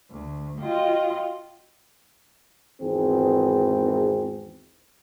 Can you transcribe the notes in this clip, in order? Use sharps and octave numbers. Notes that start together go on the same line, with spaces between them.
D2
F4 F#4 D#5 G5
G#1 E2 G#2 C4 G#4